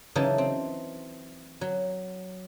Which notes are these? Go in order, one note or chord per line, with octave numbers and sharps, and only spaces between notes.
C#3 E3 F#3 D#4 A5
C4
F#3